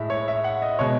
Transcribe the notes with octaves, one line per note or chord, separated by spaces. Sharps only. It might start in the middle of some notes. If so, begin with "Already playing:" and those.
Already playing: A2 G#3 E5
C#5
E5
F#5
D#5
B2 G#3 C#5